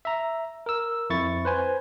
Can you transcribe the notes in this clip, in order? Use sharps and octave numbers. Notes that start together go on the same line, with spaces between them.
E5 A#5
A#4 E6
F2 E4 C#6 A6
B4 C5 G#5